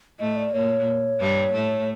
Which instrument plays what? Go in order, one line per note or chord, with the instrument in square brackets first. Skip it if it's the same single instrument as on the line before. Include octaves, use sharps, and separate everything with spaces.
[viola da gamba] A2 A3 [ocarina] D#5
[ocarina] D5
[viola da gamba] A#2 A#3 [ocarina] C#5
[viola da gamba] G2 G3
A2 A3